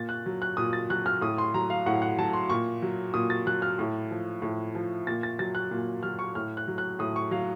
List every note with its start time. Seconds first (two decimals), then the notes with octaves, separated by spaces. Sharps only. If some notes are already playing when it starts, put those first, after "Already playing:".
Already playing: A#2 A6
0.09 F#6
0.26 F#3
0.42 F#6
0.57 A#2 D#6
0.73 A6
0.90 F#3 F#6
1.06 F6
1.21 A2 D#6
1.38 C6
1.54 F#3 A#5
1.70 F5
1.86 A2 F#5
2.02 F#5
2.18 F#3 A5
2.33 C6
2.50 A#2 C#6
2.82 F#3
3.14 A#2 D#6
3.30 A6
3.46 F#3 F#6
3.62 F6
3.79 A2
4.11 F3
4.42 A2
4.75 F3
5.07 A#2 A6
5.23 A6
5.39 F#3 A6
5.55 F#6
5.71 A#2
6.03 F#3 F6
6.19 C#6
6.35 A2 F6
6.57 F#6
6.68 F#3
6.78 F#6
6.99 A2 D#6
7.16 C#6
7.31 F#3 F5